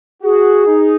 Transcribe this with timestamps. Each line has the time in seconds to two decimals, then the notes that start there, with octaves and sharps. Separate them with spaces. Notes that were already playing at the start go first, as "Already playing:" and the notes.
0.23 F#4 G#4
0.67 D#4